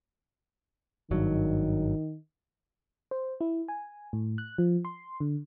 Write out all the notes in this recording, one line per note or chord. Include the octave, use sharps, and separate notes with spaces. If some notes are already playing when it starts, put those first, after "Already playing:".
G#1 G2 D#3 F#3
C5
E4
G#5
A2
F#6
F3
C6
D3